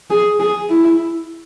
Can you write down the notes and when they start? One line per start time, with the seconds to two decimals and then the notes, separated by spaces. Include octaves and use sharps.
0.10 G#4
0.40 G#4
0.69 E4